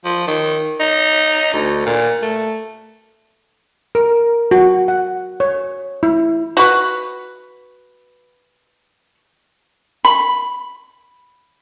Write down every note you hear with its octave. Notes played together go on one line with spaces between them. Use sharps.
F3
D#3
D#4
D2
A#2
A3
A#4
F#4
F#5
C#5
E4
F#4 B4
B5